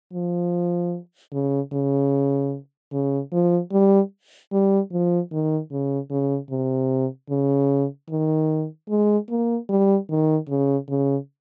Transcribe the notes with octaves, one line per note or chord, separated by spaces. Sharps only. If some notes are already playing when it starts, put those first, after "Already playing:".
F3
C#3
C#3
C#3
F3
G3
G3
F3
D#3
C#3
C#3
C3
C#3
D#3
G#3
A#3
G3
D#3
C#3
C#3